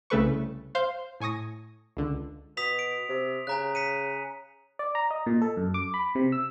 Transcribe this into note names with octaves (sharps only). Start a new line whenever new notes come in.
C2 C#3 A3 A4 B4 C#6
C5 F5 C6 G6
A2 G#5 C#6 D#6 A#6
C#2 D3
B2 D#6 B6 F7
D7
C3
C#3 G#5 A#5 F#6
B6 C#7 D#7
D5
A#5
D#5
A#2
A4
F#2
D6
B5
C3
E6